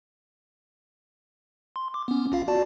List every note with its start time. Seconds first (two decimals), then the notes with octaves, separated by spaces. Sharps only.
1.76 C6
1.94 D6
2.08 B3 C#4
2.32 A#1 F4 F5
2.48 F#4 D5 A5